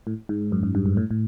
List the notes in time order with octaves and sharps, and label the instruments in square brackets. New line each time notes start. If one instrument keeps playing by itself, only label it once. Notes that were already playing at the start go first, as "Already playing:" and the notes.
[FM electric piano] A2
G#2
F#2
F#2
G2
G#2
A2
A2